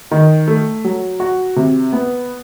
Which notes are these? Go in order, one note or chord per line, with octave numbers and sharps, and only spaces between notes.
D#3
A3
F#3
F#4
C3
B3